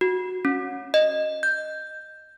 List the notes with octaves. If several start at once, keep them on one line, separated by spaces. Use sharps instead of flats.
F#4
C#4
D#5
G6